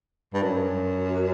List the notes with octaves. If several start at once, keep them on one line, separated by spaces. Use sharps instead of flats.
G2
F#2